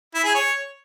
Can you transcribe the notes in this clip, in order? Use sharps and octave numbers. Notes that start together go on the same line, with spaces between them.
E4
G#4
C#5